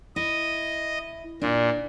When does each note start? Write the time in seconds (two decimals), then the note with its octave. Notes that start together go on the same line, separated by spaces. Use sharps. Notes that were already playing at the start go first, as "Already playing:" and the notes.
0.16 E4 D#5
1.42 A#2 D4